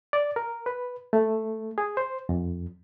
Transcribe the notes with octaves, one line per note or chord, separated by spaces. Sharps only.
D5
A#4
B4
A3
G#4
C5
F2